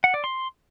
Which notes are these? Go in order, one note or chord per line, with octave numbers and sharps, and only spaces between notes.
F#5
D5
C6